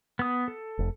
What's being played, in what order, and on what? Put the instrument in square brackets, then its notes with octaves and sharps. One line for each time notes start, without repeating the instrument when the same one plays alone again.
[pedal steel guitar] B3 D#6
A4
[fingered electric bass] F1